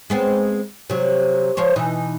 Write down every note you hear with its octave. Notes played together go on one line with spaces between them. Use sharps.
G#3 B3 C4
C3 F#3
F3 C5 C#5
B2 E3 D#4